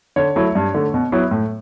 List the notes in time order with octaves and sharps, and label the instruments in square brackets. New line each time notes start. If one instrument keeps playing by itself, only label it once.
[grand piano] D3 C#5
F#3 A3 E4
G2
D3 A3
B2
F#3 B3 E4
A2